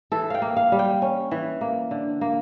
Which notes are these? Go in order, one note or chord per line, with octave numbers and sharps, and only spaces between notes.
E3 A4
F5 G5
A#3
F5
G3
G5
C#4
E3
A#3
D3
A#3